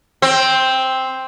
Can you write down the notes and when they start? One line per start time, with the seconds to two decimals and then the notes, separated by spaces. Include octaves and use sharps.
0.22 C4